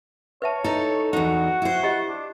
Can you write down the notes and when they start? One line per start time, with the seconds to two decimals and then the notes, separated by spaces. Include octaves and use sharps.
0.42 B4 C#5 E5 A5
0.64 D#4 E4 A4
1.13 E2 D#4 F#4
1.62 E4 C5
1.83 F4 G4 D#5
2.09 D4